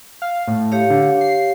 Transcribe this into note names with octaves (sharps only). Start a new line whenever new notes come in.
F5
A2
G4 C#5 F5
D3
C7